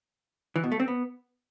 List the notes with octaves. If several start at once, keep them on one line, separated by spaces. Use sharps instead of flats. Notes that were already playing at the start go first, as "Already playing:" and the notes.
E3
B2
A3
C4
B3